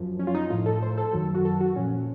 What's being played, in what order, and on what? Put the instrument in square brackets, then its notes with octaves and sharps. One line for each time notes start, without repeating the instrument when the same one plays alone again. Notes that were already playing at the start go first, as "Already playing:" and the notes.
Already playing: [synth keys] F#2 F3
C#4
F4
D#4
A2 F3 F4
A4
C5
A4
F#2 D#3 F#3
F#4
A4
F#4
A#2 F3 C#4